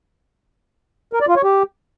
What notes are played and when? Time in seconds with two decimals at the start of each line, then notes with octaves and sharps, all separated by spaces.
1.13 A#4
1.21 D5
1.28 F4
1.36 C#5
1.44 G4